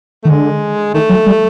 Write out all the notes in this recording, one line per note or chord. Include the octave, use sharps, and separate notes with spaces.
D#3 A3
D3 G#3
D#3 A3
F#3
G3